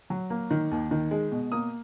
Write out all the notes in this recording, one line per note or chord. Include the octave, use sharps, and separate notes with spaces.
F#3
A#3
D#3
D#2
D#3
G#3
B2
A#3 D#6